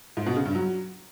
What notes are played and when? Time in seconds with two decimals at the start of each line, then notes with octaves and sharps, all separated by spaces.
0.17 G#2
0.26 B2
0.36 C#3
0.45 G2
0.55 F#3